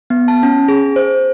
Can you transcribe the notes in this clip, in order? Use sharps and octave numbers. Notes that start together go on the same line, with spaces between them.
B3
A5
C#4
G#4
C5